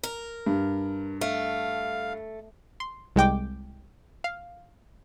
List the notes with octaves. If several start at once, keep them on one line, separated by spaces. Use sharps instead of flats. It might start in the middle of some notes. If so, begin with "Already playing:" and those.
A#4
G2
A3 F5
C6
C2 G#3 G5 D6
F5